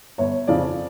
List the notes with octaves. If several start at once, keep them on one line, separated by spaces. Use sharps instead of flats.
G1 C#5
F2 C#3 F3 D5